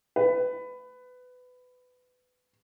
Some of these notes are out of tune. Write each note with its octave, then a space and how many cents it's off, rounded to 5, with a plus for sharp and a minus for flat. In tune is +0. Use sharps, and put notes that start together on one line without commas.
B4 +20